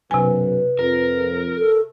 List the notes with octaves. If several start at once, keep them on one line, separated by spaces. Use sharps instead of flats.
B1 F#2 C3 B4 G#5
F2 A#4
A4